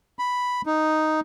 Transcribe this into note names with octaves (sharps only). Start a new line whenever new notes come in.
B5
D#4